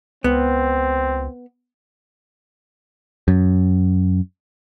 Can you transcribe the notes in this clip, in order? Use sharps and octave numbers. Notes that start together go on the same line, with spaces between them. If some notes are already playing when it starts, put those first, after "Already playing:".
C#2 B3 C4
F#2